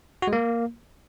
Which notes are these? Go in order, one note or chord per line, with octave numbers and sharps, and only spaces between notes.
F#4
G#3
A#3